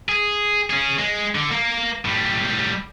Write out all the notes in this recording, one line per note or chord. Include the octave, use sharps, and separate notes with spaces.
G#4
C#4 G#4
G#3
D3
A#3
A2 G3